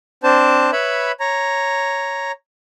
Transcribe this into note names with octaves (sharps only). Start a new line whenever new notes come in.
C4 D4 C5 A5
B4 C#5 E5 B5
C#5 A#5